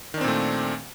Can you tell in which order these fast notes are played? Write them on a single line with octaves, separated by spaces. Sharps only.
D#3 D4 C4 A#2 A3